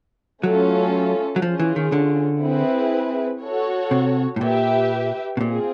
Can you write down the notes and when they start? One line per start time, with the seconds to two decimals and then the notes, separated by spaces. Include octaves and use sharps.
0.43 F#3 A3 C#4 F4 A4
1.36 F#3
1.42 F3 C#4 F4 G#4
1.60 E3
1.76 D#3
1.92 D3
2.42 C4 E4 G#4 B4
3.42 F#4 A4 C#5
3.91 C3
4.36 A2
4.41 A#2 G4 B4 E5
5.37 B2
5.41 A#2 C4 F4 G#4